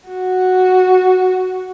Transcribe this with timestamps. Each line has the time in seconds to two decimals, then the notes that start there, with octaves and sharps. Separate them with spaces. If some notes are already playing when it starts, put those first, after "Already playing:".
0.08 F#4